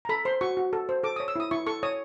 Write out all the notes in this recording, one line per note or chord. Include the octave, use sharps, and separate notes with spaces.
A#5
A4 B5
C5 C6
F#4 C#6
F#4
A4
C5
A4 D6
C#5 D#6
E6
E4 D#6
E4 C#6
A4 C#6
C#5 D#6